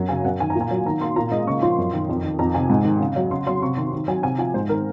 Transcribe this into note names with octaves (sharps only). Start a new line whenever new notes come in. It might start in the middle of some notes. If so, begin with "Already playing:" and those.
Already playing: F#2 F#3
C#3 G#5
F#2 F#5
D#3 G#5
A#5
A#2
G#5
F#3
D#3 A#5
A#3 C6
A#2 A#5
G#3 D#5
C#3 C#6
F3 C6
F#2
D#3
F2
D#3
F2 A#5
C3 G#5
G#2
D#3
C#3
F#3
C#3 C6
F#3 C6
C3 C#6
D#3 C6
D#3
F#3 G#5
C3 G#5
F3 G#5
G#2 C5
D#3 A#4